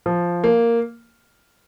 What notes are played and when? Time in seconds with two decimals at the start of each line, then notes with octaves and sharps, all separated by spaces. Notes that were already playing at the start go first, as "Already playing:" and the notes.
0.06 F3
0.44 A#3